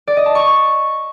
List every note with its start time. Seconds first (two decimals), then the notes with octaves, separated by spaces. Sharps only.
0.07 D5
0.17 D#5
0.26 A5
0.35 C#6